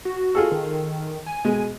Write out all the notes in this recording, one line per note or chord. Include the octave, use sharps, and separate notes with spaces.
F#4
F4 G#4 A4
D#3
G#5
B2 G#3